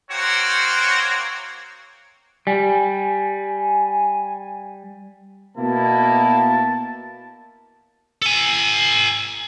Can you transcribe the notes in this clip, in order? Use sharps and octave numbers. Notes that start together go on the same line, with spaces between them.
A#3 C4 F#4 C#5
G3 G#5
B2 A#3 E4 A5
A4 G#5